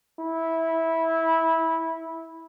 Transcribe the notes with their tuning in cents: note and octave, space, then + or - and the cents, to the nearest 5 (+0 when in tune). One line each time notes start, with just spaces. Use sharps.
E4 -15